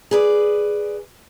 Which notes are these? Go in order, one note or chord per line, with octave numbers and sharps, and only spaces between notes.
G#4 B4 D5